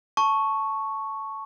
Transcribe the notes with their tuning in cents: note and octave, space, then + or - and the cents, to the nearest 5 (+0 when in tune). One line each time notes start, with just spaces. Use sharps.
A5 +0 C#6 +0